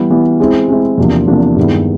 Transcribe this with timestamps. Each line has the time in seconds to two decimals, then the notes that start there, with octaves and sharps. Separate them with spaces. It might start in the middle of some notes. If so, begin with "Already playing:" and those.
Already playing: E3 G3 B3
0.10 E3 G3 B3
0.40 G#3 C4 E4
0.68 G#3 C4 E4
0.98 E2 C3 F3 A#3 D4
1.27 E2 C3 F3 A#3 D4
1.56 G2 D#3 G#3 B3 E4